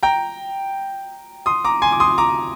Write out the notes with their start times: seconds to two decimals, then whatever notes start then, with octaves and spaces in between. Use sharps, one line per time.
0.03 G5 A#5
1.46 C6 D#6
1.65 A#5 D6
1.82 G#5 C6
1.92 D6
2.00 C6 D#6
2.18 A#5 D6